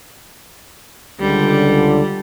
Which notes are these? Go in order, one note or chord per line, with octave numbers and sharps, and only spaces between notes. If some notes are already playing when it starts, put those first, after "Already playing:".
C#2 D3 G3